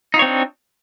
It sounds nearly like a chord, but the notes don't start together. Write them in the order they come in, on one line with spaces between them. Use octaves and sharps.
D#4 F4 C#5 C4 D4